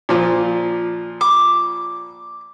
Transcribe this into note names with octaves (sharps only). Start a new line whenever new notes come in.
A#2 F3
D6